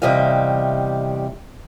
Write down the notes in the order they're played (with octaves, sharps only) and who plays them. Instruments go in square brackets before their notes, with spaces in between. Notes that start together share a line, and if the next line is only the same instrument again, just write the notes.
[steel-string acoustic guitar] E2 C3 G3 G4 D#5 F5